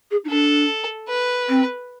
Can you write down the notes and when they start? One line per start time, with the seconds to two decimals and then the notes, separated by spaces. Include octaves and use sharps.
0.10 G#4
0.24 D#4
0.30 D4 A4
1.09 B4
1.48 C4